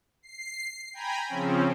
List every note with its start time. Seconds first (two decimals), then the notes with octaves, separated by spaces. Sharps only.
0.22 C7
0.94 G5 G#5 A#5 B5
1.29 C#3 F3 C4 C#4